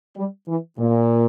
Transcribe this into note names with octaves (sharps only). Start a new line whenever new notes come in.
G3
E3
A#2